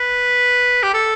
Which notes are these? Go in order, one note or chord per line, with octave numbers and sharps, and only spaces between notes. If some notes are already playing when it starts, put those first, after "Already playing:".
Already playing: B4
G4
A4